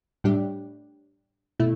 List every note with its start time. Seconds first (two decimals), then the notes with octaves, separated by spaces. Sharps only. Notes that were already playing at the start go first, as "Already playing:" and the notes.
0.24 A2 G3 D4 G4
1.60 B2 A3 E4